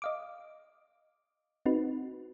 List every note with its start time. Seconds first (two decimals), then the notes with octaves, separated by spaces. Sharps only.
0.02 D#5 F5 D6
1.66 C4 D#4 F#4 B4